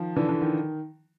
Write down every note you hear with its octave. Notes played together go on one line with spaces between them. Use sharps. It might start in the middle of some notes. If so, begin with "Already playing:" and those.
Already playing: D#3 F3
D3 E3
D3
D#3